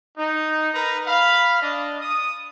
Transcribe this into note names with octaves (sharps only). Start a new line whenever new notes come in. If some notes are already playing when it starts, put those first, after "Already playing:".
D#4
A#4 B4 A#5
F5 B5
D4 D#5
D#6